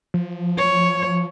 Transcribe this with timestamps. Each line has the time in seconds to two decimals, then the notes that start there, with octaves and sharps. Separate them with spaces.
0.14 F3
0.58 C#5